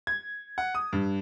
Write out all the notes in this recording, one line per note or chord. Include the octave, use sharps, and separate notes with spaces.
G#6
F#5
D#6
G2